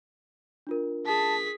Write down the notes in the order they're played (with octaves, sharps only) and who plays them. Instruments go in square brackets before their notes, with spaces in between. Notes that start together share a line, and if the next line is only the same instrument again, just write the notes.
[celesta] D4 F4 A#4
[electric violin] G#4 B6 [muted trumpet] A5